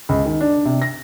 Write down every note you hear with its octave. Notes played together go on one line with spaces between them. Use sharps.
C#2
D#3
D4
C3
A#6